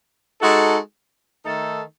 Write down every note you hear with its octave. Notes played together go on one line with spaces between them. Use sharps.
G#3 D#4 F#4 A4
D#3 A3 D#4 A4